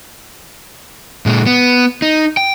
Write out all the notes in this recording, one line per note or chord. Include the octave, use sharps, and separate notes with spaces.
A#2 G#3
B3
D#4
G5